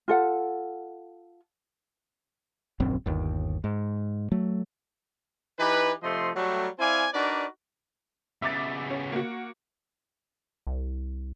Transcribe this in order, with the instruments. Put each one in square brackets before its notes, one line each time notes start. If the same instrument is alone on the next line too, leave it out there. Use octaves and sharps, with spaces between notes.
[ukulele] F4 A4 F#5
[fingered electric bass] D#1 A#1 F#2 C4
G1 D#2
G#2
F#3 A3
[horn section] E3 D#4 G4 B4
C3 F3 A3 D#5 C6
F#3 G3 A3
C4 E4 D5 F5 G#5
D4 D#4 F#4 A#4 B4 D5
[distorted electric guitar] C#3 B3 [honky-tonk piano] E5 D6 A6
[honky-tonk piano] C#4
A#3 F#4
[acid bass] C2